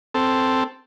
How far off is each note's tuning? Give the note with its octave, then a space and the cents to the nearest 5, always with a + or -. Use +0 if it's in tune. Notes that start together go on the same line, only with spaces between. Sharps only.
C4 +0 A4 +0